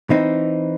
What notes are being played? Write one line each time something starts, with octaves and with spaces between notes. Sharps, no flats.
E3 C4 D#4